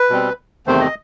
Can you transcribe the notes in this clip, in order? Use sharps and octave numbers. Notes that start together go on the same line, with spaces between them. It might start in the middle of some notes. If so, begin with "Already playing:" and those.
Already playing: B4
B2 G3 C4
E2 C3 D#3 A3 C4 C5
D#5